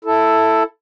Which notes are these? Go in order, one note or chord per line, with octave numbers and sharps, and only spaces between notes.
E4 A4